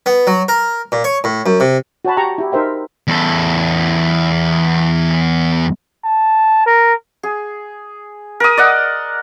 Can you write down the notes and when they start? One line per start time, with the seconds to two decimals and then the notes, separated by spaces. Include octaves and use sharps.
0.06 B3
0.27 F#3
0.48 A#4
0.92 A#2
1.04 C#5
1.24 A2
1.46 F#2
1.60 C3
2.05 F#4 C#5 A5 B5
2.17 G4 G5 A#5 C#6
2.38 E4 G4
2.52 D#4 A#4 C5 E5 G5
3.08 E2 A4
6.04 A5
6.66 A#4
7.23 G#4
8.40 A#4 D#6
8.57 D5 D#5 F#5